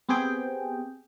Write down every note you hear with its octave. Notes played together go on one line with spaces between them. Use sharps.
B3 C4 G4 G#4 G5